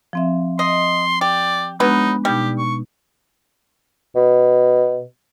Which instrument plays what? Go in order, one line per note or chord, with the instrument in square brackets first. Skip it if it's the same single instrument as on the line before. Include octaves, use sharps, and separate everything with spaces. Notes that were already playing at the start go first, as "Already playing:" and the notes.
[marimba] F3 C4 E5
[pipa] D#5 [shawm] C6
[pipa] G4 [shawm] D5
[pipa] F#3 B4 [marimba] G#3 B3 D4 [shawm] D#4
[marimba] B2 D#4 G6 [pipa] G3 [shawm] G4
[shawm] C#6
[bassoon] B2